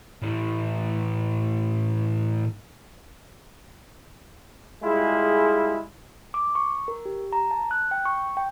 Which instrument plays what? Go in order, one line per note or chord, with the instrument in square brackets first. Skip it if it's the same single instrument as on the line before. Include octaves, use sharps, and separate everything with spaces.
[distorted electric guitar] A2 E3
[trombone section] G3 G#3 E4 F4 G#4
[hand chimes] D6
C#6
A#4
G4
A#5
A5
F#6
G5
C#6
G5